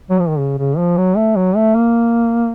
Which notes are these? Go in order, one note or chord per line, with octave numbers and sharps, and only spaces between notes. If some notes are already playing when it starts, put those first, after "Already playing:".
F#3
F3
D#3
C#3
C#3
F3
F#3
A3
F#3
A3
A#3